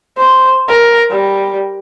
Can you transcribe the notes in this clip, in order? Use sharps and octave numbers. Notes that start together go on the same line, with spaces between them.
C5
A#4
G3